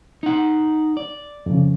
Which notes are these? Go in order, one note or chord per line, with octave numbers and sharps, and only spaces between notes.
D#4 F#5
D5
F2 C#3